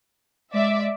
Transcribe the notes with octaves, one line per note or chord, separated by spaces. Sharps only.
G#3 D5 E5 D6